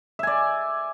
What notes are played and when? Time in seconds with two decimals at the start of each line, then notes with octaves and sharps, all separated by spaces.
0.19 E5
0.23 G#5
0.27 D5